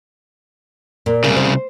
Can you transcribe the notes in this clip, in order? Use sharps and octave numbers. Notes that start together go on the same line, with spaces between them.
A#2
C2 C#3
C5